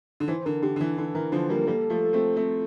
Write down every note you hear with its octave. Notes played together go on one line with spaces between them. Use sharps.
D3
E3 C5
D3 A#4
D3 G4
D3
E3
D3 A4
E3 A#4
D3 F3 C5
G3 A#3 A#4
G3 A#3 A4
F3 A3
A3 C4
A3 C4